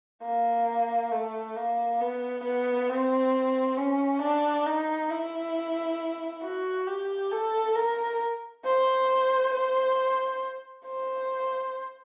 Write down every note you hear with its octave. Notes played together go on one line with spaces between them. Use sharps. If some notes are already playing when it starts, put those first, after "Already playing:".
A#3
A3
A#3
B3
B3
C4
C#4
D4
D#4
E4
F#4
G4
A4
A#4
C5
C5
C5